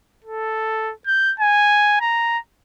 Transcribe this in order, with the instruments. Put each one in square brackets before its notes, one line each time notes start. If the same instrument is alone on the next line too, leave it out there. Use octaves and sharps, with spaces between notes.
[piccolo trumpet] A4
G6
G#5
A#5